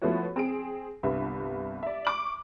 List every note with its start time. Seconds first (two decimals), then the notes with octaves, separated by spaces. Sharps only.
0.02 F3 A3 B3 E4 F#4 C#5
0.36 C4 G#4 D7
1.03 G1 C2 B4 E5
1.83 D5 E5
2.05 C#6 D6 F#7